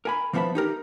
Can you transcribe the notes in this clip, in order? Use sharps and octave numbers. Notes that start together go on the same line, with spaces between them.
A#4 G#5 B5
E3 F3 B3 E5 A5 B5
D#4 G4 A#4